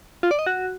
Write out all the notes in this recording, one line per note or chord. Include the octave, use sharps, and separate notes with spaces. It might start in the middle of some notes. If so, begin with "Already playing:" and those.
F4
D5
D#5
F#4